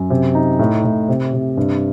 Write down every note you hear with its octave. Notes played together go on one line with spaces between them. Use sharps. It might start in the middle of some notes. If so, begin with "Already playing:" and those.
Already playing: F#2
C3
D#4
A2
A2
C3
C3
G2